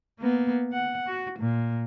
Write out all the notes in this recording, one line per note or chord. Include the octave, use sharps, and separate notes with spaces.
A#3 B3
F#5
F#4
A#2